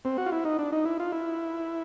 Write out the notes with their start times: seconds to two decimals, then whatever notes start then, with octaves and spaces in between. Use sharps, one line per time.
0.05 C4
0.18 F#4
0.26 F4
0.32 E4
0.45 D#4
0.59 D4
0.72 D#4
0.85 E4
1.00 F4
1.12 E4